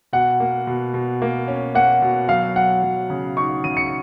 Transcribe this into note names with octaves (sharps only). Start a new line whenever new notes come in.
B2 F#5
A#3
B2
B2
A#3
C#4
A#3 F#5
B2
F#3 F5
F#3 F#5
F#3
C#3
D#4 C#6
C#3 D#7
C#7